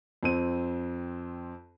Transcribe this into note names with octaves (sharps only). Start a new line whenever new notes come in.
F2 C4 D#7